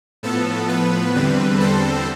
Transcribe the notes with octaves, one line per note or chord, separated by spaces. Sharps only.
A2 F3 B3 A4
B4
E2 D3 G3 C4
A4 C5